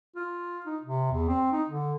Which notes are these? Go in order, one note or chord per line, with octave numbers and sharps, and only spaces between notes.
F4
D#4
C3
E2
C4
D#4
D3